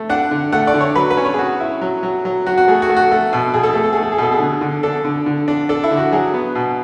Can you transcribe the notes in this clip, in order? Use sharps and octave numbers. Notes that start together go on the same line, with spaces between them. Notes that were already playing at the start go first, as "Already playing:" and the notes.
Already playing: A3
D4 F#5
D3
A3 F#5
D5
D3
C#5
F#3 B4
B4
C#4
C#5
G#4
C#4 F#4
E4
F#3
F#3
F#3
F#3 F#4
F#4
A3 G#4
F#4
A3
F#4
A3
B2
B2 G#4
A4
A3 G#4
A4
A3 G#4
A4
G#4
B2 A4
G#4
D3
D3
D4 A4
D3
D3
D4
D4 A4
E4
D3
F#4
F#3 G#4
B3
B2